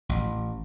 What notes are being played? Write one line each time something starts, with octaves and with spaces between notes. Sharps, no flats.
A1